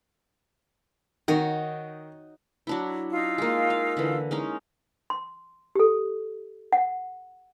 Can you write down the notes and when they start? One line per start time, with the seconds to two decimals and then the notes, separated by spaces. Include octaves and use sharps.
1.28 D#3 D#4 F#4 C#5
2.67 F#3 D4 E4
3.12 D#4 F4 E6
3.38 G#3 A#3
3.70 F5
3.97 D3 E3
4.31 G#3 C#4 D#4
5.10 C6
5.75 G4 A4
6.73 F#5